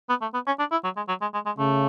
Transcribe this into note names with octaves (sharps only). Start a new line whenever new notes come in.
B3
A3
B3
C#4
D4
E4
F#3
G#3
F#3
G#3
G#3
G#3
C#3 A3